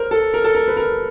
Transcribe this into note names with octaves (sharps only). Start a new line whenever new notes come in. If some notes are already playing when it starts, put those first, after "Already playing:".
Already playing: A#4 C5
A4
A#4
A4
A#4
B4
A#4